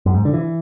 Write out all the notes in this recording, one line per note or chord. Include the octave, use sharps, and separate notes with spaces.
F#2
G#2
D3
E3